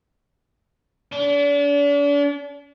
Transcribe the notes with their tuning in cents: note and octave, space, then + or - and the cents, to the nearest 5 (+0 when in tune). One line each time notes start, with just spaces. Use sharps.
D4 -40